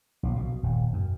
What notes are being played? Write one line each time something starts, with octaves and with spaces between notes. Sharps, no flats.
A#1
B2
D#1
F#2